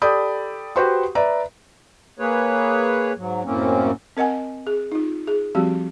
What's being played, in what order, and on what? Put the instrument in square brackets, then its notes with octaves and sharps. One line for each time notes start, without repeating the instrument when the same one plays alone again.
[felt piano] G4 A4 D5 B5 D#6 G6
F#4 G4 B4 C5 C6 C#6
B4 D5 E5 A#5
[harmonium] A#3 G#4 B4 C#5
G#2 F#3
F#2 A2 A#3 C4 C#4
[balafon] C4 A#4 D#5 F#5 G#5
G#4
D#4 F4
G#4
F3 G3 C4 F#4 G4